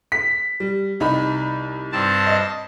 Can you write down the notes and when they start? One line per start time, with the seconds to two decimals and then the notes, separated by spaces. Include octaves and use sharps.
0.12 B6
0.60 G3
1.00 C2 D#4 B5
1.92 G2 C4 A5
2.27 D#5